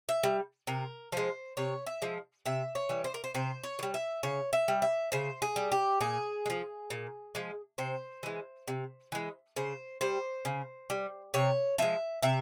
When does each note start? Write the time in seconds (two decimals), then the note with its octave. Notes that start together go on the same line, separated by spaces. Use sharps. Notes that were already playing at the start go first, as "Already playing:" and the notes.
0.09 E5
0.23 G3
0.67 C3 A#4
1.12 F3 G#3 C5
1.57 C3 C#5
1.86 E5
2.02 F3 G#3
2.46 C3 E5
2.75 C#5
2.89 E3 G3
3.04 C5
3.14 A#4
3.24 C5
3.34 C3 C5
3.63 C#5
3.79 E3
3.83 G3
3.94 E5
4.23 C#3 C#5
4.53 E5
4.68 G3
4.82 E5
5.12 C#3 C5
5.42 G#4
5.56 G3
5.72 G4
6.01 A#2 G#4
6.46 G#3
6.50 F3
6.90 A#2
7.35 F3 G#3
7.78 C3 C5
8.23 E3 G#3
8.68 C3
9.12 E3 G#3
9.56 C#3 C5
10.01 G3 C5
10.45 C#3
10.90 G3
11.34 C3 C#5
11.78 F3 G#3 E5
12.22 C3 E5